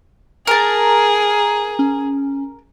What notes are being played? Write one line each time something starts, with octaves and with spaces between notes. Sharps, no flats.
G#4 A#4 A5
C#4